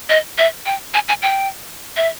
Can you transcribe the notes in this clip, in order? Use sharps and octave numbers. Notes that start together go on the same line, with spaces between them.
D#5
E5
G5
G#5
G#5
G5
E5